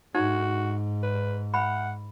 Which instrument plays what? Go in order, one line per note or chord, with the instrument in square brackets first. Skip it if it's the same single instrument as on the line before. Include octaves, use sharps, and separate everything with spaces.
[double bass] G#2 [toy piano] D#4 [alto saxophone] F#4
[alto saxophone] B4
[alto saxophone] F#5 [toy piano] B5